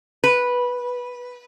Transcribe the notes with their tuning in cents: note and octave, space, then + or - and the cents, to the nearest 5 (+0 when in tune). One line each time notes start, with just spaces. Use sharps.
B4 -10